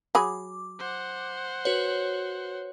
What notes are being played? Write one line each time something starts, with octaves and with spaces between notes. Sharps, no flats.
F#3 G#4 B5 D6
C5 F#5
F#4 B4 C#5